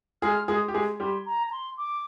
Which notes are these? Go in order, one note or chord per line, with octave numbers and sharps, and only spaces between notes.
G#3 G#4 F6
G#3 G#4 D#6
G4
G#3 G#4
G3 G4 C6
A#5
A#5
C6
D6